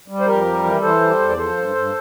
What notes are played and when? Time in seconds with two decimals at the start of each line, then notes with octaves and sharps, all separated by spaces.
0.08 G3
0.20 C5
0.26 F2 G4 A#4
0.45 G3
0.64 E3
0.82 E3 A4 C5
1.01 G3
1.19 E2
1.29 D5
1.38 F3 A4 C5
1.57 G2
1.75 G2